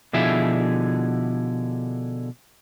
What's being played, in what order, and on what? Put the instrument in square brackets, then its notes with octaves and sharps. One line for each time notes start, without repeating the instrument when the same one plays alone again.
[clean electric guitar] B2 D3 F3 E4 G#4 E5